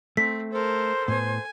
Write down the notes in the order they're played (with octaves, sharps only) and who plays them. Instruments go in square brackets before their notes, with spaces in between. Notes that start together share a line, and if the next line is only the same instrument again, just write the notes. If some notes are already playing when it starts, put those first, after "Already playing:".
[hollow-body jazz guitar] A3 [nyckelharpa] C4 [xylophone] B6
[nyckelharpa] A4 A#4 [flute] C5
[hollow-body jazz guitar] A2 B3 [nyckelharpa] G#5